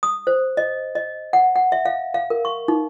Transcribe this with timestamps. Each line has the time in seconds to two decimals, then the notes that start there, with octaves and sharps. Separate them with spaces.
0.03 D#6
0.27 C5
0.57 D#5
0.95 D#5
1.33 F#5
1.56 F#5
1.72 E5
1.86 F5
2.14 F5
2.30 A#4
2.45 C#6
2.68 D#4